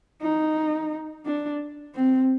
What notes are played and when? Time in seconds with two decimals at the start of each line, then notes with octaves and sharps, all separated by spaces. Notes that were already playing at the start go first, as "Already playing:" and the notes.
0.22 D#4
1.26 D4
1.95 C4